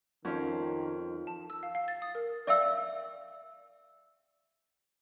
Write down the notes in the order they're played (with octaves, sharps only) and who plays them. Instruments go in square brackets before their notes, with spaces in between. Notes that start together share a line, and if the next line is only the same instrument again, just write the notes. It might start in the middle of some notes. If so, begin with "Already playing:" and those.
[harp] F2 C#4 [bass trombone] D#3
[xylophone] A5
E6
F5
F5
A6
D#6
A#4
[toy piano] D5 E5 F5 G5 E6